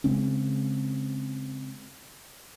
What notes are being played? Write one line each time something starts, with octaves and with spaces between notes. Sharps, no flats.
C#3 G#3 C4 C#4